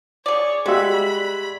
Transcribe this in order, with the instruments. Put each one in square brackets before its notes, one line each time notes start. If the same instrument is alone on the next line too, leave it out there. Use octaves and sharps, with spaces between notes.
[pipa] G#4 D5 [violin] C#5
[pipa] G3 [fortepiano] G#3 F#4 E5 [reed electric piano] G4 D5 [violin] B5